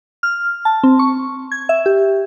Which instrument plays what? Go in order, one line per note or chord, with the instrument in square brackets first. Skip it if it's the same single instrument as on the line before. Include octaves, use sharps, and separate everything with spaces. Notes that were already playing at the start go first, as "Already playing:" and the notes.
[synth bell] F6
A5
C4
C#6
G#6
E5
G4